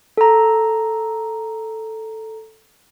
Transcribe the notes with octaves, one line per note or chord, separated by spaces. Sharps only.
A4 A#5